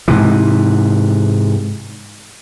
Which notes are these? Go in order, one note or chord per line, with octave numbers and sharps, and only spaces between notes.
G#2 C3 E3